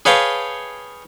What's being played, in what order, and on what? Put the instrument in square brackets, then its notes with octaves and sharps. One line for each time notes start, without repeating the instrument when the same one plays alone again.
[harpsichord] G#4 B4 C#5 F5 G5 A5